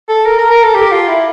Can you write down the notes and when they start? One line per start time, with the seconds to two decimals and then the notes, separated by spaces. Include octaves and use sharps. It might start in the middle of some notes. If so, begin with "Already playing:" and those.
0.09 A4
0.26 A#4
0.38 A#4
0.51 A#4
0.63 A4
0.75 G4
0.92 F4
1.08 E4